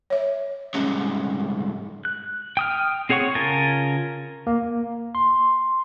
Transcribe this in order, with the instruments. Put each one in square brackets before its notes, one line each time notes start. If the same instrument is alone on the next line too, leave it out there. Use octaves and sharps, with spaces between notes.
[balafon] C#5 E5
[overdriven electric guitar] C2 G#2 [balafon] C#4
[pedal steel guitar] F#6
G5 D#6 F6
C4 G#4 C#5 F#5 C#6
C#3 F4 A#4 G#5 A5
[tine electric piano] A#3
C6